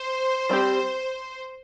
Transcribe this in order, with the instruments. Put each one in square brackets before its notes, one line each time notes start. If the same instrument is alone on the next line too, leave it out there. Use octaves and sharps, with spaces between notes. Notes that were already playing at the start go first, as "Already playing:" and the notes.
Already playing: [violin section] C5
[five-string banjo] G3 C4 G4